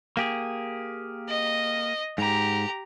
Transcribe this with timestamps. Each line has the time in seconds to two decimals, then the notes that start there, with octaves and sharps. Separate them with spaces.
0.17 A#3 G4 G#4
1.29 D#5
2.18 G#2 G4 A#5